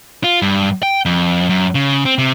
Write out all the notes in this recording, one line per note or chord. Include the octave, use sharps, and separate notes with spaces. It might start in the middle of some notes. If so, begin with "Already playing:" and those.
F4
G2
G5
F2
F#2
C#3
C4
C3